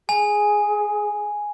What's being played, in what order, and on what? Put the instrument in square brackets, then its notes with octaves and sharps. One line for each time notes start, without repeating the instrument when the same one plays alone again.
[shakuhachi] G#4 [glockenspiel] G#5